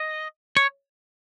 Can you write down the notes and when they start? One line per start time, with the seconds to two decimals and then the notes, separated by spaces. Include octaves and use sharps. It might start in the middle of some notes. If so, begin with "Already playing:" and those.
Already playing: D#5
0.57 C#5